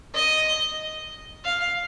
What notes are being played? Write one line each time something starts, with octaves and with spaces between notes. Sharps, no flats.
D#5
F5